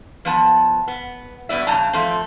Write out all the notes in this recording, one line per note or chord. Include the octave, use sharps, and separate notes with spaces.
F3 B3 A5
B3
G2 B2 B3 D5 E5
G2 C#3 A5 A#5
F3 A3 C4